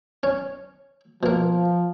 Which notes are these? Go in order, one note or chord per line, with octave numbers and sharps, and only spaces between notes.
C#4
B2 F3 A#3